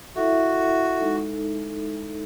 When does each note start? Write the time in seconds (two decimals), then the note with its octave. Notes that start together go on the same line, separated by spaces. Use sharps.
0.16 E4 F#4 A4 E5
1.00 G#3 D#4 A4